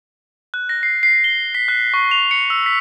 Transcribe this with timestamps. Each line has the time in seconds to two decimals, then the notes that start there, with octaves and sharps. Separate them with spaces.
0.54 F#6
0.69 A#6
0.83 C7
1.03 C7
1.24 G7
1.55 B6
1.68 F#6
1.94 C#6
2.11 F7
2.31 C#7
2.50 E6
2.66 B6